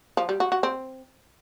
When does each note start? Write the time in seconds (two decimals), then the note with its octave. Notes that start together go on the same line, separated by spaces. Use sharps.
0.17 F3
0.29 G3
0.40 F#4
0.52 F#4
0.63 C4